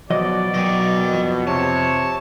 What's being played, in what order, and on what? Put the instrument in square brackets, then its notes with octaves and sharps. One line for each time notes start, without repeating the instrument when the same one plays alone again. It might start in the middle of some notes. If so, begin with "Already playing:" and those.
[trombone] B2 [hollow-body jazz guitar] F3 F#3 D#5 [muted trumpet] D5
[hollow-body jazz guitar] B1 F#3 [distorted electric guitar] D#5 G5
[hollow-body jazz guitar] F2
[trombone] C3 [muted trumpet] C#5 [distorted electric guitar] A5